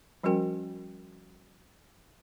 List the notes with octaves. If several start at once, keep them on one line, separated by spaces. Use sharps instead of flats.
F3 G3 C#4 F#4 A#4 G5